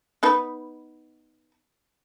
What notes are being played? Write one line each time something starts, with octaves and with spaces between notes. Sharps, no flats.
B3 D#4 B4